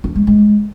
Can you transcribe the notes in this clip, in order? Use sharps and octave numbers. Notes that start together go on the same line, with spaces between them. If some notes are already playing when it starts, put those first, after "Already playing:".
D4
G#3
G#3